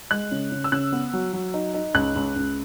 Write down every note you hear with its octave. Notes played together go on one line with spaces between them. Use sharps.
G#3 F#6
C#3
C#3
E6
C#3 F#6
B3
F#3
F#3
D#4
D#4
C#2 F#6
C#2
C#2